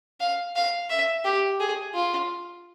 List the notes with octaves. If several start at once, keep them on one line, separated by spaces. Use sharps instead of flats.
F5
F5
E5
G4
G#4
F4